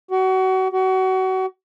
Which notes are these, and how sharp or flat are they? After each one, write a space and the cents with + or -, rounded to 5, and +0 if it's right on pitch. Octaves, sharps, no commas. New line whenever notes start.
F#4 +30
F#4 +30